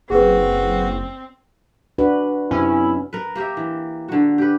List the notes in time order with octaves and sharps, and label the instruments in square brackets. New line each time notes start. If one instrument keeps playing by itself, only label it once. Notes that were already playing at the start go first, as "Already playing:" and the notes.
[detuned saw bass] F#1 [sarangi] C4 [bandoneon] F#4 [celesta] G#4 B4
[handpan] D4 F#4 B4
[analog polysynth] F#2 C3 [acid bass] C#4 [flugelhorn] E4
[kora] A#4 B4
A#3 G4 A#4 E5
E3
D3 F#4
G4 B4